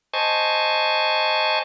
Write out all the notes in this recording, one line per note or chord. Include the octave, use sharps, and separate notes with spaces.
C5 D#5 G#5 A5 C#6